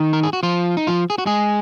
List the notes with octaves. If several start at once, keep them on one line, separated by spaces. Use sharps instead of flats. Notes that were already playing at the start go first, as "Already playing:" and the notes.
Already playing: D#3 D#4
A#4
G#4
F#4
F3 F4
D#4
F3 F4
G#4
F#4
G#3 G#4